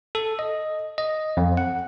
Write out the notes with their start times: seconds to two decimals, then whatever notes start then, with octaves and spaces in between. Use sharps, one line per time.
0.15 A4
0.39 D#5
0.98 D#5
1.37 F2
1.57 F#5